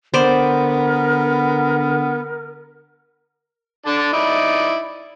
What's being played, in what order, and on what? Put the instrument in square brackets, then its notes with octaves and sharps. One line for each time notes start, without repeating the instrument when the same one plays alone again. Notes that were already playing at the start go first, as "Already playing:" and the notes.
[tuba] D3 [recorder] B3 [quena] A#4 [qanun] C5 D5
[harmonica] D3 D4 A5
D#4 E4 D5